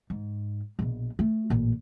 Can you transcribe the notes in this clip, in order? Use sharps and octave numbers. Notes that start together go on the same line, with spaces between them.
G#2
A#1 B2
A3
A1 A#2